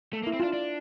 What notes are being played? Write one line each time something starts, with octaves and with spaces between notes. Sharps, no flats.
A3 A4
A#3
E4
C4
D4 F4
D4